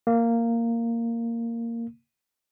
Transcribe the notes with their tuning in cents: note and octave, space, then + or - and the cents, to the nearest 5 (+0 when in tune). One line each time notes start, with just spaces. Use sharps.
A#3 -10